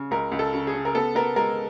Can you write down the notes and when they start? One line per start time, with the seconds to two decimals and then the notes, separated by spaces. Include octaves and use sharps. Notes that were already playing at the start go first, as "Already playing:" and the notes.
Already playing: C#3
0.11 C#2 A#4
0.32 C#2
0.39 A4
0.53 C#3
0.67 G#4
0.74 C#3
0.85 A#4
0.95 B3 A4
1.15 B3 A#4
1.36 G#3 A#4